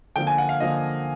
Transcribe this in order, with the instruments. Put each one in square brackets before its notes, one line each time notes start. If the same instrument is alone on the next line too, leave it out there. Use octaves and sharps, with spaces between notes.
[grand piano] D3 F3 A#3 G5
G#5
F#5
F5
D3 F3 A#3 D#5